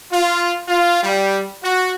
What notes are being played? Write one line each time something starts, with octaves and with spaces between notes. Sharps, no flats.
F4
F4
G3
F#4